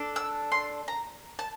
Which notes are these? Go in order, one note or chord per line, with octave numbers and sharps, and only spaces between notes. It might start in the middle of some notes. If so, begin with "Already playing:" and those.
Already playing: D4 A4
E6
C6
A#5
A5